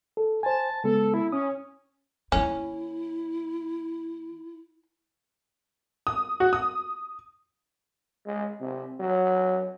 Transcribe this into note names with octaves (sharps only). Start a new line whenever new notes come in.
A4
C5 G#5 A5
C#3 G#3 B3 A4
E4
C#4 D#6
D#3 A#3 C#4 E4
D#6
F#4
D#6
G#3
C3
F#3